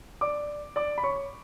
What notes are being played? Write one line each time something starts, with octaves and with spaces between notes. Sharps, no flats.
D5 D6
D5 D6
B5
C#5 C#6